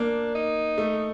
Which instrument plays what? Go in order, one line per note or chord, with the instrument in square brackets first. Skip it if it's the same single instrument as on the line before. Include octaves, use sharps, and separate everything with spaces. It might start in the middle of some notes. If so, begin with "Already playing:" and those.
Already playing: [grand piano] A#3 [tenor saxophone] D4
[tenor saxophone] D#4
[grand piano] A3